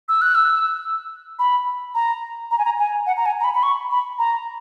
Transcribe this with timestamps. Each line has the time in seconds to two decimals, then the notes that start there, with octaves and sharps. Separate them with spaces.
0.09 E6
0.21 F#6
0.35 E6
1.39 B5
1.95 A#5
2.51 A#5
2.58 G#5
2.65 A#5
2.79 G#5
3.06 F#5
3.17 A#5
3.26 G#5
3.40 A#5
3.44 B5
3.54 B5
3.63 C#6
3.90 B5
4.19 A#5